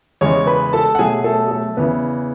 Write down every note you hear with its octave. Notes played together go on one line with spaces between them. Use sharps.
E2 C#3 G#3 C#5 C#6
B4 B5
A4 A5
F#5
B2 F#3 A3 G#4 G#5
A3 A4
G#4
A3 A4
E2 C#3 E3 B3 B4